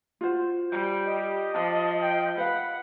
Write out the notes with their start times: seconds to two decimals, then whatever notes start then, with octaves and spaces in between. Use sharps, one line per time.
0.21 F4 F#4 C5
0.71 G3 G6
1.05 G4 D#5
1.54 F3 A5
2.02 G5
2.38 B4 F5 F#5 B5